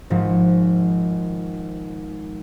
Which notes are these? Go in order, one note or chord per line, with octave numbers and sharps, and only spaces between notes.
G#1 G#2 F3